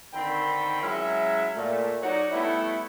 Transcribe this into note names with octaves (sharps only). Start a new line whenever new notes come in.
D3 D#3 C4 G5 B5
F#3 G#3 C#4 E4 E5
A#2 A3
F#3 D#4 F#4 C#5 D5 F#5
G3 A3 B3 E4